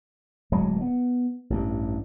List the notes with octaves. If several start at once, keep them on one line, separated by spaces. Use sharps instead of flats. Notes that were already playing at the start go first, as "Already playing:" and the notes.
D1 F#3 G#3
B3
A1 G2